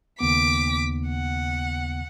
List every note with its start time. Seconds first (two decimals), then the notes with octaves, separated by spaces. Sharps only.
0.21 D#2 C#3 B3 D6 B6
1.09 F#5